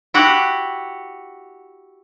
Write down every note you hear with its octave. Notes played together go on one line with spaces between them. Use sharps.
E4 F#4 G4 F#5